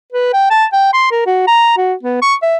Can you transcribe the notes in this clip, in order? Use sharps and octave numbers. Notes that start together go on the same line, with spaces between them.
B4
G5
A5
G5
C6
A#4
F#4
A#5
F#4
B3
C#6
E5